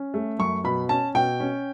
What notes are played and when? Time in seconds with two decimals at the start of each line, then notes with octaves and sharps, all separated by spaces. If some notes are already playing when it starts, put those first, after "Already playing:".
Already playing: C#4
0.14 A3
0.39 F#2 C#6
0.64 B2 B5
0.89 C#4 A5
1.15 B2 G5
1.40 C#4